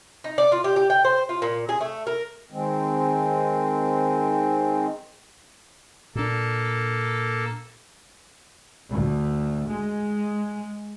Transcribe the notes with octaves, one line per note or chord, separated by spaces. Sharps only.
D#4
D5
F4
G4
G4
G5
C5
F4
A#2
G#4
A3
A#4
D#3 G#3 C4
A#2 A#3 D4 A4
D2
G#3